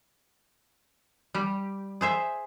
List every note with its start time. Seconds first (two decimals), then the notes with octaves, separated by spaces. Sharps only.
1.35 G3 G4
2.01 G#4 C5 E5